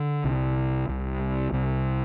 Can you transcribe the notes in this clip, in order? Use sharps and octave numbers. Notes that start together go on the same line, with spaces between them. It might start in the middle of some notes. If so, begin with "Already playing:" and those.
Already playing: D3
C2 C3
C2 C3
C2 C3